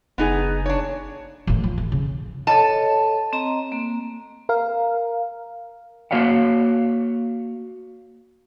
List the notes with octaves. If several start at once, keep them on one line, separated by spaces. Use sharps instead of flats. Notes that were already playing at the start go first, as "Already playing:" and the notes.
F#1 B3 D#4 G#4
D4 C#5
A1 D#3
F3
A1
C#3
A4 C#5 D#5 A5
C4 D#5 A#5
A#3
A#4 F5
A#3 F#4 C#5 F5 F#5